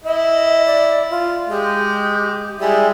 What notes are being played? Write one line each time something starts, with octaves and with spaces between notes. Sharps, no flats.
E4 D#5
D5
F4
G#3 G4
G3 G#3 E4 G#4